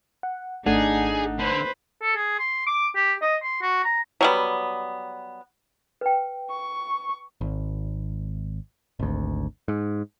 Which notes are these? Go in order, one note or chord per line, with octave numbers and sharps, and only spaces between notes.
F#5
G#1 A3 D4 D#4 G#4 F#5
D3 B4 C5
A4
G#4
C6
D6
G4
D#5
C6
F#4
A#5
F#3 G3 B3
B4 G5
C#6
G#1
G#1 D2
G#2